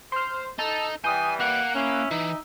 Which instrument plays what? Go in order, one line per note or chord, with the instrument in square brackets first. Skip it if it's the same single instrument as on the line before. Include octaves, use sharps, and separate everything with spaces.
[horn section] C5 [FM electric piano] C6 F6
[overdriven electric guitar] D#4 [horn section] A4 [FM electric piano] A5
[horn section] E3 G3 [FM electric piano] G5 D#6 G6 [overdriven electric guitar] G#5
[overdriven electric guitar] A#3 [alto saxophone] F#5 [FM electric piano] F#6
[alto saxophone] C#4 [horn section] E4 E5
[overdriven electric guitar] E3 [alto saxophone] D#4